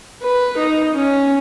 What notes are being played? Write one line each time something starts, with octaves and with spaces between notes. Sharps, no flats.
B4
D#4
C#4